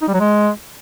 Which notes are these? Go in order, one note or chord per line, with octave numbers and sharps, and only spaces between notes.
D#4
G3
F#3
G#3